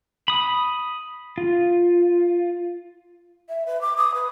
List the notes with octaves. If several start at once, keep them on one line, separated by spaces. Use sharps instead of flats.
B5 D#6
F4
E5
B4
D6
D#6
B4